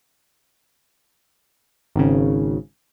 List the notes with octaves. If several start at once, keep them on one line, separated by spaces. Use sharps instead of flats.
G#1 C#3